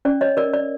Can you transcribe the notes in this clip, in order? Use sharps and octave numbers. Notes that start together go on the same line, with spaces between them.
C#4 D5
C#5 D#5
A#4 D5
D5